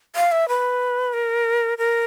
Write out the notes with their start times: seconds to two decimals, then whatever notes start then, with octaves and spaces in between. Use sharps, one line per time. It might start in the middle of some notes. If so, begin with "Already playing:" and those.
0.16 F5
0.32 E5
0.49 B4
1.13 A#4
1.78 A#4